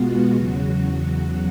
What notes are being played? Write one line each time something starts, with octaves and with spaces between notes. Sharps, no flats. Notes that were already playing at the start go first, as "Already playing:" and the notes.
Already playing: B2 G#3 B3 F4 F#4
E2 C#3 F#3